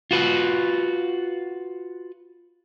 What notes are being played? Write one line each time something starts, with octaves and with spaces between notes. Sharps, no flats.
F4 F#4 B4